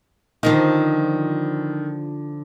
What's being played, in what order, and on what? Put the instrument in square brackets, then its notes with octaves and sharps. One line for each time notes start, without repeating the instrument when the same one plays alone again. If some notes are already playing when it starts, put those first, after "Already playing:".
[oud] D3 F3 D#4 [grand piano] D#3